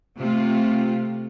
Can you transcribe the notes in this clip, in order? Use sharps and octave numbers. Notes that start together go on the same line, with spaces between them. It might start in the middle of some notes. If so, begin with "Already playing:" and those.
C3 A3 C4 F4